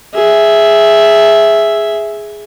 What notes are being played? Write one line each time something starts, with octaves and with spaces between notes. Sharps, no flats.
G#4 E5